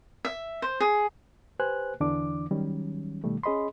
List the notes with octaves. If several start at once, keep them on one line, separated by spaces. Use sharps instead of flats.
E5
C5
G#4
G4 B4 C5 G#5 F#6
E2 D3 E3 D4 D6
D#3 F#3 G3 C#4
B2 D#3 G3 A3
C#4 G#4 D#5 B5 C6